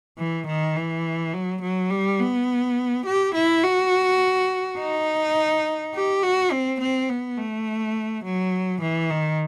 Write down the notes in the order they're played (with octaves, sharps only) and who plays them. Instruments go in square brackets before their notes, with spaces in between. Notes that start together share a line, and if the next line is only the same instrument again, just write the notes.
[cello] E3
D#3
E3
F#3
F#3
G3
B3
G4
E4
F#4
D#4
G4
F#4
C4
C4
B3
A3
F#3
E3
D#3